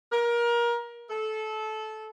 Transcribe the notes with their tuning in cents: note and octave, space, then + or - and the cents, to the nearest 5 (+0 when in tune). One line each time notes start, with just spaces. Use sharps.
A#4 +25
A4 -20